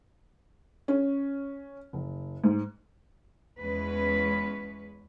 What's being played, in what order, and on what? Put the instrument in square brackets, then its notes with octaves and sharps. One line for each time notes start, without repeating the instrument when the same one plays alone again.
[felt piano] C#4
F#1
G#2
[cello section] E2 G#3 C#4 B4